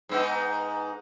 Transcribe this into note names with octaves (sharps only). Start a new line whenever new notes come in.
G#2 B3 D#4